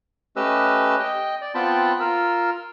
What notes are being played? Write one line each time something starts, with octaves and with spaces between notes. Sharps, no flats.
A3 C#4 G4 B4 D#5 E6
D#5 G5
D5
B3 C4 F4 G5 A5 B5
F4 A#4 E6